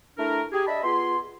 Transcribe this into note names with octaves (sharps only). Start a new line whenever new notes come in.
A3 D4 E4 A#4
G4 G#4
D4 D#5 E5 A5 B5
B3 F4 G#4 C6